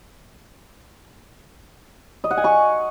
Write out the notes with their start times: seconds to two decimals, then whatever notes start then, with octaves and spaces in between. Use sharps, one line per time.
2.24 D#5
2.31 F#5
2.37 G#5
2.44 C#6